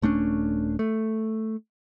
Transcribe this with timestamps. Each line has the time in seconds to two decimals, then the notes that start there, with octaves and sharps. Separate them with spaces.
0.02 D#1 A3 C#4 D4
0.79 A3